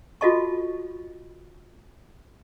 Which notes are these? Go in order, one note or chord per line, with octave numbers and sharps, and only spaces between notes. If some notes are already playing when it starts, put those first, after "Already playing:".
F4 F#4 A4 D#5 A5 C#6